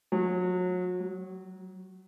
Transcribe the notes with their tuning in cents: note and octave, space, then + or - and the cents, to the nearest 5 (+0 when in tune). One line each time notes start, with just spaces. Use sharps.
F#3 -35
F#3 +25